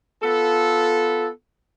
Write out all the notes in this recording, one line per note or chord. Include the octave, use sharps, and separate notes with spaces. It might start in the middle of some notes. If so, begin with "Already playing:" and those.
B3 F4 A4